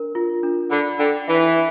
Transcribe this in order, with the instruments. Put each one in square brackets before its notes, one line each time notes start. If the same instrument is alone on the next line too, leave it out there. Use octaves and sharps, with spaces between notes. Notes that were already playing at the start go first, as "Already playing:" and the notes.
Already playing: [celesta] D4 A#4
F4
D4
[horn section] D3 [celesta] B5
[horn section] D3 [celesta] G5
[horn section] E3 [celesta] E5